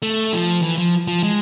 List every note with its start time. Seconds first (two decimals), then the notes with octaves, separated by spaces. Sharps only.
0.02 A3
0.33 F3
0.63 E3
0.78 F3
1.08 F3
1.23 G#3